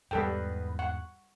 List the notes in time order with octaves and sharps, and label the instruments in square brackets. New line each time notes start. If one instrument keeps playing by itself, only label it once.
[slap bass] E2 G#2 [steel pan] G3 A4 G5 [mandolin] B3 B4
[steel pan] F#5 [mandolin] C#6